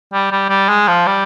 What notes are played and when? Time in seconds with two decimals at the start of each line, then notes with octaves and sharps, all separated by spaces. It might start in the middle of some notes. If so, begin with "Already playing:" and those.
0.13 G3
0.32 G3
0.49 G3
0.69 G#3
0.88 F3
1.06 G3